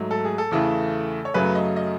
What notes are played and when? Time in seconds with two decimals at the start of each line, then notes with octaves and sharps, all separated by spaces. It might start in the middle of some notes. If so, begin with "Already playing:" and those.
Already playing: G#2 F#3 A3
0.11 A4
0.25 G#4
0.38 A4
0.51 E2 C#3 E3 A3
1.25 C#5
1.34 F#2 C#3 F#3 A3 B4
1.55 D#5
1.76 D#5